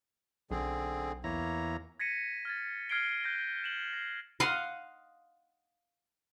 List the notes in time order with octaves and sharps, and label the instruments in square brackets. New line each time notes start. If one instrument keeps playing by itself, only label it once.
[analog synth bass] B1 [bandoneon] D3 C4 G#4
[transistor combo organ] E2 E4 A#5 [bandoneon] A#3 C#5
[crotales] G#6 A#6 B6 C#7 D#7
F6 G#6 A6
F6 G#6 C7 D7 G7
F#6 G6 A#6
E7 F#7 G7
A#6 C7
[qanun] D#5 F5 F#5 C6